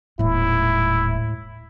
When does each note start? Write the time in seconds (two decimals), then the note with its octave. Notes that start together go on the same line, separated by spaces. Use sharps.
0.19 D#1 A2 G#3 E4